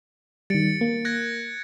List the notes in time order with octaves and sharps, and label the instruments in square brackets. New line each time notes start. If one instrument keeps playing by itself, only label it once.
[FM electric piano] D#3 G3 [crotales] A6 C#7 D7
[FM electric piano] A#3
[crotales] F#6 G#6 A#6